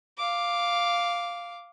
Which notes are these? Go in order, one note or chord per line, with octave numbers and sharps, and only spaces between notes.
F5 D6